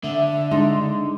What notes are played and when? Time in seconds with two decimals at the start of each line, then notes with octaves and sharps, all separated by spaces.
0.04 D3 E5
0.51 G#3 D4 D#4 C6